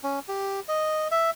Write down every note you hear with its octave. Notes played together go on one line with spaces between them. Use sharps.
C#4
G4
D#5
E5